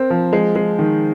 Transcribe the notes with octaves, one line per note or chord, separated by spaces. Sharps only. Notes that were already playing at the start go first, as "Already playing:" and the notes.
Already playing: C4 A#4
F3
G#3
G#3
D#3